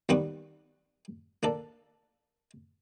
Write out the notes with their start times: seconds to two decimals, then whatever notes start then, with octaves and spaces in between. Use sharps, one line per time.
0.09 D#2 G3 B3 F#5 C#6 D6
1.43 A#3 D4 A4